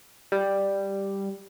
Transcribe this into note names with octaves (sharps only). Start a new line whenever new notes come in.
G3